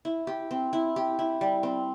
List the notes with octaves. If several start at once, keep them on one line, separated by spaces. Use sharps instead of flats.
E4
G4
C4
E4
G4
E4
G3
C4